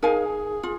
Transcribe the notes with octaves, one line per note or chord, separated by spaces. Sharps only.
D#4 G#4 A#4 F5 G#5
F4